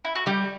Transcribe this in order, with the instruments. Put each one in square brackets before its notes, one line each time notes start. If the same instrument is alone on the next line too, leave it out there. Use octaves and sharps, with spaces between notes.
[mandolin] E4
F#4
[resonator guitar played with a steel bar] G3 [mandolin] G4